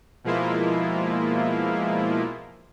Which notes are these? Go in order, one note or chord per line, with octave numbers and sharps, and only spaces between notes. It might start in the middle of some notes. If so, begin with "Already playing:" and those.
B2 F3 G#3 A#3 E4 F4